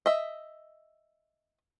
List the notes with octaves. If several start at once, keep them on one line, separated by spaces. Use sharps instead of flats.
D#5 E5